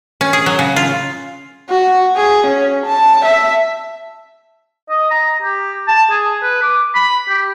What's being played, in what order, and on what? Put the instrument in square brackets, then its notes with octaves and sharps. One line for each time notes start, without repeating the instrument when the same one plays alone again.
[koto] C#4
G#4
F#3
C#3
F4
[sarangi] F#4
G#4
C#4
A5
E5
[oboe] D#5
A#5
G4
A5
G#4
B4
D6
B5
G4